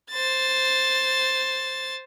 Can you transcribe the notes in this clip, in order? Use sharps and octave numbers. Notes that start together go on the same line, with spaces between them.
C5 A6